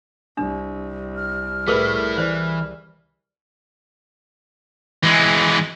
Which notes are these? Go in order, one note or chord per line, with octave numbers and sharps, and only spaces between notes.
C2 D4
F6
A3 E4 G#4 A#4 B4
E3 C5 D5
E3 G#3